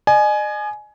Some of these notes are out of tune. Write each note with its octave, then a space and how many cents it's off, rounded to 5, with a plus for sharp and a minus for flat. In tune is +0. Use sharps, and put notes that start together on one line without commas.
D#5 -45 G#5 +20